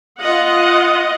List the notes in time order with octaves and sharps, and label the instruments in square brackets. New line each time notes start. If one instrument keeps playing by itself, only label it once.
[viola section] F4 D#5 F#5